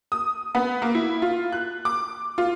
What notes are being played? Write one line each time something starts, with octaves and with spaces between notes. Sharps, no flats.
D#6
B3
A#3
E4
F4
F#6
D6
F4